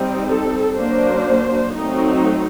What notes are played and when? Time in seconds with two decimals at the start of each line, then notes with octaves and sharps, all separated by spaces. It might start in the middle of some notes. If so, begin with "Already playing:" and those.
Already playing: G3 C4 D#4
0.26 A4
0.75 F#3 A#3 D4 C5
1.76 F#3 A3 C4 D#4